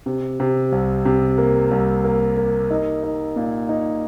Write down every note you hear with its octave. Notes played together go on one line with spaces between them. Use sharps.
C3
C3
C2
C3
A#3
C2
A#3
A#3
D#4
D#4
A#2
D#4